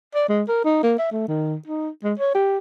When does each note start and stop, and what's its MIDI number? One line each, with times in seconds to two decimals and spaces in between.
0.15 0.28 74
0.29 0.43 56
0.48 0.62 70
0.64 0.82 63
0.83 0.96 58
0.98 1.07 76
1.12 1.26 57
1.28 1.56 51
1.67 1.89 63
2.03 2.14 56
2.19 2.31 73
2.35 2.58 67